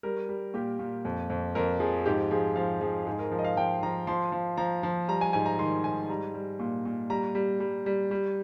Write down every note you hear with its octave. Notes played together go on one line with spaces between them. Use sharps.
G3 A#4
G3
A#2 G4
A#2
F2
F2
F2 A#4
F3 G#4
G#2 G4
F3 G#4
F3 F5
F3 G#4
G#2 G#4
A#4
F3 A#4
D#5
F5
F3 G5
F3 A#5
F3 C6
F3
F3 A#5
F3
G3 A#5
G#5
G#2 G#5
A#5
D#3 C6
G#2 G#5
G3 A#5
G3
A#2
A#2
G3 A#5
G3
G3
G3
G3